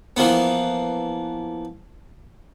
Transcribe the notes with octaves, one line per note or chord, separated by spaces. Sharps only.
E3 F3 A#3 B3